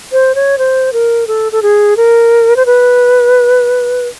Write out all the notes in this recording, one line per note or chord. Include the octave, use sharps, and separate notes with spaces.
C5
C#5
C5
A#4
A4
A4
G#4
A#4
C5
B4